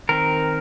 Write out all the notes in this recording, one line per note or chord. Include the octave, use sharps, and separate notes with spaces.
D#3 C4 A#4